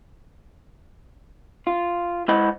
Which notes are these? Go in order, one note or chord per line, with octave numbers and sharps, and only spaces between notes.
F4
G#3 E4 C5 D#5 F#5 B5